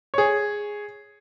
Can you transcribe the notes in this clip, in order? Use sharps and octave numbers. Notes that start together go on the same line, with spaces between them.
G#4 C#5